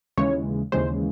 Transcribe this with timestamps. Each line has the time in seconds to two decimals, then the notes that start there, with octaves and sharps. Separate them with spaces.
0.17 D#2 C#3 E3 G#3 C#5
0.72 D#2 C#3 E3 G#3 C5